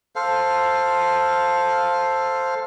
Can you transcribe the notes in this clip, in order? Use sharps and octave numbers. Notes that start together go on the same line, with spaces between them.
A4 C5 F5